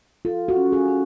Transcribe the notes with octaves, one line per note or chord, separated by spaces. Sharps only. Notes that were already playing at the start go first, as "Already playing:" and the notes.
F4 A4
F#4
C#4
G#4
C#4